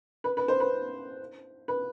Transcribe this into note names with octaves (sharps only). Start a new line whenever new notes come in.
B4
B4
C5
B4
B4